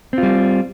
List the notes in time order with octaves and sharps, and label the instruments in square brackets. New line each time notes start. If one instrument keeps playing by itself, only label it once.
[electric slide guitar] C4
F4
G3